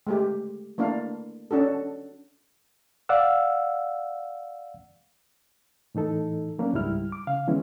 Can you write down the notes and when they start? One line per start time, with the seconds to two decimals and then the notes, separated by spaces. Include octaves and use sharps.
0.07 G#3 A3 G4
0.78 A3 A#3 D4 E4 F5
1.51 C#4 D4 F#4 A4
3.09 D5 F5 F#5 E6
5.95 A2 E3 D#4 A4
6.59 F#3 A#3 C#4 D4
6.73 C#2 G#2 G3 E4 F6
7.12 D6
7.27 C#3 F5
7.48 D3 E3 G#3 B3 C#4 E4